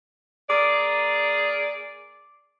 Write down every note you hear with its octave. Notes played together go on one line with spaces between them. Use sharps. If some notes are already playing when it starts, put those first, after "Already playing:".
A#3 G#4 D5 D6